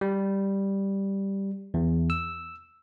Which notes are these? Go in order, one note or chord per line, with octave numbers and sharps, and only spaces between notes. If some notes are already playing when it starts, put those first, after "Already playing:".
G3
E2
E6